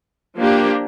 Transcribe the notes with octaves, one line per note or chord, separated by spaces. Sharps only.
F3 A#3 D4 G4